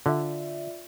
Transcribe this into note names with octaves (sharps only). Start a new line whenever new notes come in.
D3 F4 D5 E5